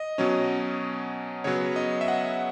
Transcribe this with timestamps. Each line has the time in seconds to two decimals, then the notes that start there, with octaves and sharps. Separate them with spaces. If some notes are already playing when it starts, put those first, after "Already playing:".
Already playing: D#5
0.18 B2 F#3 C#4
1.44 C#3 F#3 B3 C#5
1.76 D#5
2.01 E5
2.08 F#5